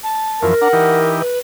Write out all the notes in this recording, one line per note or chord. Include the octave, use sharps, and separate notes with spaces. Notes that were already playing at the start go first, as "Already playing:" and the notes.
A5
F#2 E3 F3 A#4
D4 F#5 A#5
E3 D#4 G4
B4